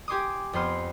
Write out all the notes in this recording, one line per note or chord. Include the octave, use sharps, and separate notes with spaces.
G4 G#5 C6 D6 D#6
F2 B3 C5 C6 F6 D#7